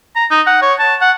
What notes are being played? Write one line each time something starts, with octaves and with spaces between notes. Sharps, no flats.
A#5
D#4
F#5
C#5
A5
F#5